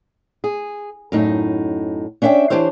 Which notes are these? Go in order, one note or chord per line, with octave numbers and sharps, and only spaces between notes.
G#4
F#2 A2 D#4
C#4 D4 E5 F#5 G5
E3 D4 G4 C5 C#5